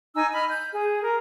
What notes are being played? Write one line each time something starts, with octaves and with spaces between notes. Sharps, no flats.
D#4 G#5 E6
D#5 B5 F6
G6
G#4
A#4